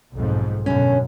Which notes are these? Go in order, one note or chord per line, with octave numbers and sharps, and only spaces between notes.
B1 F2 G#2
F#2 B2 D3 F#3 C#4